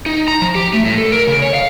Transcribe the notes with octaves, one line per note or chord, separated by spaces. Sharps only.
D#4
A#5
F3
G4
A3
A2
A4
A#4
C#3
C#5
F5